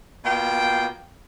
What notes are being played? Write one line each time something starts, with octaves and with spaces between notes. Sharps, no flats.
B2 A#3 F4 G5